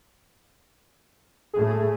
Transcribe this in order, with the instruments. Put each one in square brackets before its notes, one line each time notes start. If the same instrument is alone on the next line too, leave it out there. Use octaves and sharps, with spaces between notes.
[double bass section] A2 A3 [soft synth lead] G#4